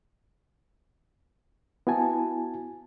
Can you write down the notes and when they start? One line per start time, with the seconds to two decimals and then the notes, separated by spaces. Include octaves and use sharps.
1.87 B3 E4 F#4 G#5 A5